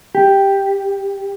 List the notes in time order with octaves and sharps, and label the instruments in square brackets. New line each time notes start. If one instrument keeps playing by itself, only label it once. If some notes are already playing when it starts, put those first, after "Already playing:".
[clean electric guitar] G4